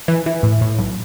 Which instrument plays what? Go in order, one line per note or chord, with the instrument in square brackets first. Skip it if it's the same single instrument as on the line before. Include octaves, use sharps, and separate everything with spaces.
[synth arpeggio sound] E3
E3
A2
A2
B1